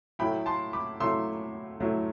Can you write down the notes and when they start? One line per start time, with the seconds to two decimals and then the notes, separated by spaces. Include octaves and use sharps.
0.19 A2 F#3 A3 E4 G5 B5
0.46 A5 C6
0.73 B5 D6
1.00 A2 F#3 A3 E4 C6 E6
1.80 A2 F#3 A3 E4